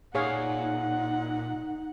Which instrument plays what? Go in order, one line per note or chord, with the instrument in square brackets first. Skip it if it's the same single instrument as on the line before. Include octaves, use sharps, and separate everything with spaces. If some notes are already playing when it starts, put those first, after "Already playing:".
[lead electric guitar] A#2 [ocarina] D#4 [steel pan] G#4 C#5 F5 [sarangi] F#5